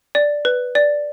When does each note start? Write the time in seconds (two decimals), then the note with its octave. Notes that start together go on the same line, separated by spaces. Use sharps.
0.15 D5
0.45 B4
0.75 D5